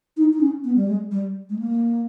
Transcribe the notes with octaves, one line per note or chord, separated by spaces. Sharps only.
D#4
D#4
C#4
B3
G3
G#3
G3
G#3
A#3